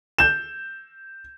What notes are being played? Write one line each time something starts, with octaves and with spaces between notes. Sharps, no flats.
G6 E7